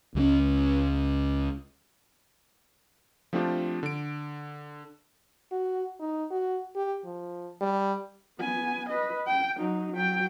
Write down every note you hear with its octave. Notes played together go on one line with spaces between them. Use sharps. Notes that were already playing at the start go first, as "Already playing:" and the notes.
C#2 F#3 C#4
F3 A3 C4 D4 F4 G4
D3 D7
F#4
D#4
F#4
G4
F3
G3
B3 G#5
B4 D#5
G5
F#3 D#4
F#3 G5